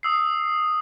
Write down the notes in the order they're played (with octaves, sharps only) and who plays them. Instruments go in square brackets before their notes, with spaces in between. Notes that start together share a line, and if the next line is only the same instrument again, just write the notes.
[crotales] D#6 E6 C7